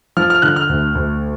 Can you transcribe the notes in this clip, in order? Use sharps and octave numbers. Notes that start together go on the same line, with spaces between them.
F3 F6
F6
D3 F#6
F6
D2
D2